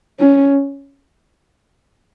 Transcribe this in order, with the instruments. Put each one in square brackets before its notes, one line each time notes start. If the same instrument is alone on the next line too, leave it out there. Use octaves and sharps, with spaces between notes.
[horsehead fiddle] C#4